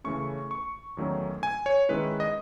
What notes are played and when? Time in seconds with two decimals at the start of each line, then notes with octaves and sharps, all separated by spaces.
0.04 C#3 E3 A3 C#4 C#6
0.51 C#6
0.97 E2 D#3 F#3 A3 C#4
1.43 G#5
1.66 C#5
1.89 D#3 G#3 C#4 E4 B4
2.20 D#5